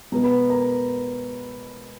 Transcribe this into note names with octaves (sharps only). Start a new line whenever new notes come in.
B2 G#3 B3 A#5
B4 B5
A#4 A#5